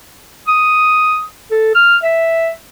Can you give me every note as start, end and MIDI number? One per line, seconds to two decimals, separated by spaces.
0.48 1.21 87
1.51 1.71 69
1.75 1.97 89
2.03 2.50 76